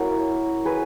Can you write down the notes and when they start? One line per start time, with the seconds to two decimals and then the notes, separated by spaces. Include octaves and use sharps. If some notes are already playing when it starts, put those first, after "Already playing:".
Already playing: A#3 C#4 E4 F#4 A#4
0.65 G#4 B4